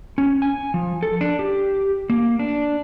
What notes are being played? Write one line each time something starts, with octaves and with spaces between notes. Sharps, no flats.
C#4
G#5
F3
A4
D4
G4
A#3
D4